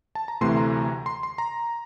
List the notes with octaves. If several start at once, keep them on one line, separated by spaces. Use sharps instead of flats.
A5
A#5
D2 C3 E3 A3 C6
A#5
C6
C6
A#5